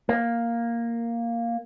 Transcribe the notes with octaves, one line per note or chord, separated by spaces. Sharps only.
A#3